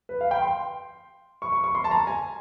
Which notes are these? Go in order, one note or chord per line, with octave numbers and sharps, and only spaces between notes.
B4
F5
G5
C6
C#6
C#6
C#6
C6
A5
A#5
G#5